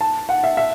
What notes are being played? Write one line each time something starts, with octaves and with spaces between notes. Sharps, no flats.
A5
F#5
E5
E5